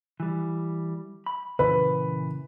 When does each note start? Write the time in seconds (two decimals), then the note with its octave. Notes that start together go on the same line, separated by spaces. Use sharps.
0.20 E3 G3
1.26 B5
1.59 A#2 C#3 E3 B4